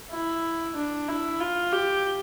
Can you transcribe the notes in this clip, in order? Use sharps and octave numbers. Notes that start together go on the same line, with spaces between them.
E4
D4
E4
F4
G4